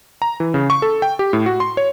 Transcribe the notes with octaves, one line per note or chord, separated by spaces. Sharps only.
A#5
E3
C#3
C#6
A4
G5
G4
A2
F#4
C6
C#5